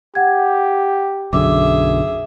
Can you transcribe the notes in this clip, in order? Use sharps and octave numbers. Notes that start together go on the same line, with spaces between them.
G4 F#5 G#6
B1 F#2 D3 G#4 E5 D6